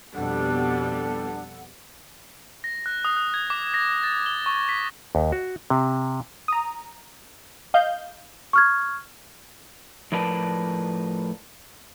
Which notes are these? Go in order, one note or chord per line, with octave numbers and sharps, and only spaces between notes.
F2 B2 G3 B3 D4 A4 F#5
A#6
F#6
D#6
F#6
G#6
D6
A#6
A6
G7
C#6
B6
D#2
F#4
C3
A#5 D#6
D#5 F5 G6
C#6 F6 G#6
A2 F3 A#4 B4 D5 A5